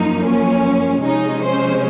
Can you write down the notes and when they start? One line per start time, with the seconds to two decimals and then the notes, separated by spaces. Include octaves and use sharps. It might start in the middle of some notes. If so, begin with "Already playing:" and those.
Already playing: F#2 F3 A#3 D#4
0.26 C#4
1.04 C3 F3 G#3 C#4 D#4
1.43 C5